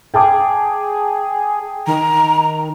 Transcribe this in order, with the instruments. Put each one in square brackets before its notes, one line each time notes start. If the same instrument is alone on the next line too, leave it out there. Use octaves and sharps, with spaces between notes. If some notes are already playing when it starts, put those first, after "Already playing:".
[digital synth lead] G#4 [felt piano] G5 A5 D6
[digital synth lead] D#3 [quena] A#5